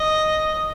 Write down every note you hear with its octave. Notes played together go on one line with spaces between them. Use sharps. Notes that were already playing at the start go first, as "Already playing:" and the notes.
Already playing: D#5